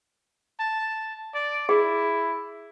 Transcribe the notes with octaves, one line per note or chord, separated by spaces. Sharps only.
A5
D5
E4 G#4